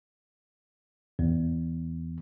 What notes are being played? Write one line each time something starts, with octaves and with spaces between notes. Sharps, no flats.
E2